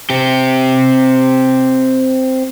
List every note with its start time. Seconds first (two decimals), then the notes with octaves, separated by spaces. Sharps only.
0.10 C4 G4